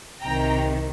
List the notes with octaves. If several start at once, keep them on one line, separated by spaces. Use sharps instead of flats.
C2 C3 D#3 G5 A#5